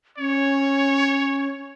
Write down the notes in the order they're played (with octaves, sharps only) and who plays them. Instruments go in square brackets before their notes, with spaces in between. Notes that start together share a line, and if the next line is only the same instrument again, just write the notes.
[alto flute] C#4 [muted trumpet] C#5